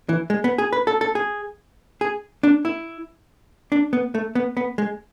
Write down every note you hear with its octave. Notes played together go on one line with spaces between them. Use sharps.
E3
G#3
B3
G#4
B4
A4
A4
G#4
G#4
D4
E4
D4
B3
A3
B3
B3
G#3